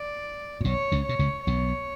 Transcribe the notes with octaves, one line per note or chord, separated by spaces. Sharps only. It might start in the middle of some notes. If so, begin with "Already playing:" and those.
Already playing: D5
A#2
B1 B2 C#5
C#2 C#3
B2 C#5
C#2 C#3
B1 B2 C#5